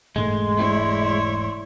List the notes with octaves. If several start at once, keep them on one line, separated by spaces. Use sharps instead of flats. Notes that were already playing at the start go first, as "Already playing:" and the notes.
E1 G#2 G#3 A3 C6
E4 C#5 D5